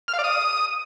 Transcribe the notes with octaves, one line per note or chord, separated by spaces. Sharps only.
F6
F5
D5
D#6